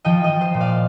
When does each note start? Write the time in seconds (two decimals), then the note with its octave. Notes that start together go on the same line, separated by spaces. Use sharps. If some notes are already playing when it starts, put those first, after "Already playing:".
0.05 F3 D#5 G5
0.23 D#5 G5
0.29 F3
0.41 C5 D#5
0.54 A#2
0.60 D5 F5